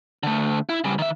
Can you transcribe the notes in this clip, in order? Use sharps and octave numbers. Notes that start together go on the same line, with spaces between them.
D3 A3
E4
C#3 G3
D#3 E5